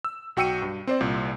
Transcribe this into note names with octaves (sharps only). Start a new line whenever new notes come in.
E6
B1 F#4 G5 E6 C#7 D#7
G2
C4 C5 D5
C2 A#2